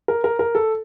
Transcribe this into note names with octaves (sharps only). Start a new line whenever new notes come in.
A#4
A#4
A#4
A4